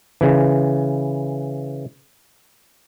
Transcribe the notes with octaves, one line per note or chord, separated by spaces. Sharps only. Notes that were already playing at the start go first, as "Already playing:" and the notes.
C#3 E3